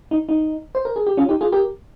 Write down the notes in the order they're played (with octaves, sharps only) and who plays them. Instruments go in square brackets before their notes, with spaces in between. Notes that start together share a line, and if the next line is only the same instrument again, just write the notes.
[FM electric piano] D#4
D#4
C5
A#4
G#4
G4
C#4 F4
D#4 G4
F4 G#4
G4 A#4